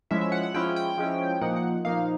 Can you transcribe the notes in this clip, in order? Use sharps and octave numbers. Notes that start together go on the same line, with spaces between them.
F3 G#3 C#4 E4 E5
E5
F#5
F#5
F3 G#3 C#4 E4 G5
G5
F3 G#3 C#4 E4
A#2 F3 A#3 D#4 F#5
F#5
A#2 F3 A#3 D#4 F5